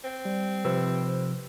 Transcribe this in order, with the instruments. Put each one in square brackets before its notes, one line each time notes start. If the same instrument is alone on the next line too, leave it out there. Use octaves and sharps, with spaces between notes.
[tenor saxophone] C4
[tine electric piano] G3
[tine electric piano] C3 F3 E6 [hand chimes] B4 C5